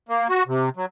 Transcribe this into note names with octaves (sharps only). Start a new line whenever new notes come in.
A#3
F#4
C3
F#3